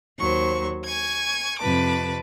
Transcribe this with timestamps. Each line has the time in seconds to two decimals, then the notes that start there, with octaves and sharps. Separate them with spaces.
0.19 D#2 F#3 C5 C#6
0.86 G#5 C#6 G#6
1.60 F2 C3 B4 A5 D6